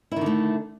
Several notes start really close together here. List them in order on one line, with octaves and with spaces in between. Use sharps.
E4 D#3 D3 A3